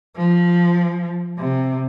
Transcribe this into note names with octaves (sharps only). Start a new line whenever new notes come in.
F3
C3